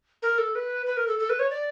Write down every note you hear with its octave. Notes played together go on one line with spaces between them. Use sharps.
A#4
A4
B4
B4
A#4
A4
A4
B4
C#5
D5